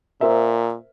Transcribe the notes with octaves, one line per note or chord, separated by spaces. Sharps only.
A#2 A#4 C5 E5